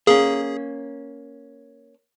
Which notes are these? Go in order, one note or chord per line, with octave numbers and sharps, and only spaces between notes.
A#3 C#4 G#4